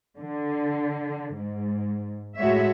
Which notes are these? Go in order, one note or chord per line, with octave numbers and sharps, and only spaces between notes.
D3
G#2
A2 G#3 F#4 C#5 E5